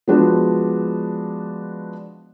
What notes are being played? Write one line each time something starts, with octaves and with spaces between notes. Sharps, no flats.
F3 G#3 B3 D4 F#4